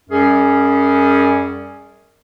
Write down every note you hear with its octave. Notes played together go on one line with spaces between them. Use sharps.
F#2 G3 C#4 G#4